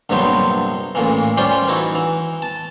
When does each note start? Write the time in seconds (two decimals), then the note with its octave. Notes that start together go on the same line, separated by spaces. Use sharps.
0.10 A#1 G2 C3 F#3 B3 C5
0.95 A1 A#2 E3
1.37 G3 C#4 F4 C5 D5
1.68 E3 D#4 E4 F#4
1.95 E3
2.42 A5